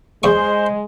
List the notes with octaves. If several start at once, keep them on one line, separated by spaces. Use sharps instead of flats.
E2 G#3 C5 C#6